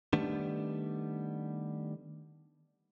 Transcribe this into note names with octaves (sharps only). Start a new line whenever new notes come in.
D#3 G3 A3 B3 D4